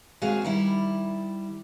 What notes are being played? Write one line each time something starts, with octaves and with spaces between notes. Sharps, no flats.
D#2 C3 G#3 F#4 G#4 F5
D#3 G3 E4